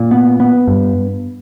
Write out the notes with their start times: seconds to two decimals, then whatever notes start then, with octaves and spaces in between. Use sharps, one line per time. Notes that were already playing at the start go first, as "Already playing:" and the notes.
Already playing: A#2
0.11 B3
0.40 B3
0.68 G2